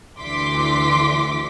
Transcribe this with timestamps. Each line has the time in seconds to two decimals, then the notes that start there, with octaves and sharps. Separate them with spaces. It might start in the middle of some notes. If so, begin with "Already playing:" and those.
0.19 D2 D3 E3 C6 D6 B6